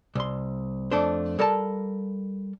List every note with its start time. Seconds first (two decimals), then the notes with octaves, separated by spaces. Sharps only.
0.15 C2 C6
0.91 F2 A3 D4 C5
1.39 G3 A4 A#4 F5 A5